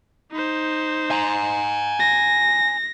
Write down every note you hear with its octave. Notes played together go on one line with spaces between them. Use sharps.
D#4 C5
G#5 A#5
A#6